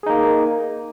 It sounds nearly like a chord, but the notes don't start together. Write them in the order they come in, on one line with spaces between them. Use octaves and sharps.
G#4 D#4 A#3